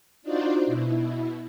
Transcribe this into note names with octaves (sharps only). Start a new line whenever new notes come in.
D4 D#4 F4 F#4 C5 D5
B2 E4